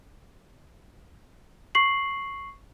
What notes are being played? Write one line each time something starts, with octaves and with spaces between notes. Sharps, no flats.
C#6 C7 F#7